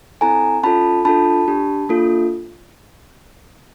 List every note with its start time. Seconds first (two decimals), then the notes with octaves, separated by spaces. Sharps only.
0.21 C4 E4 A4 G#5 A#5
0.63 C#4 F4 A4 A5 B5
1.05 D4 F4 A4 A5 B5
1.48 D4 G4
1.89 A#3 D4 F4 A4